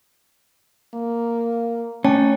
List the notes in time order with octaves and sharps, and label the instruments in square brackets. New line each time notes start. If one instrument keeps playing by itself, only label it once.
[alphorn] A#3
[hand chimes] A3 G5 A5 [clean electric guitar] C#4